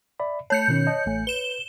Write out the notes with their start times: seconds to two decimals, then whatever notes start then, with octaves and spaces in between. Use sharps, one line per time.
0.20 D5 E5 B5
0.50 A3 C#5 A5 G6 C#7
0.68 B2 D#3 C#4
0.87 D#5 A5
1.06 A1 A3 G#5
1.27 B4 E7 G7